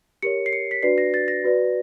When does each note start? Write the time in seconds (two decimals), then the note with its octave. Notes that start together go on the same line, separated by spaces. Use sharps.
0.22 G4 A#4 C#5 C#7
0.46 C7
0.53 C#7
0.71 B6
0.83 D4 F#4 B4 D5 C7
0.98 A#6
1.14 A6
1.28 A#6
1.44 F#4 B4 D5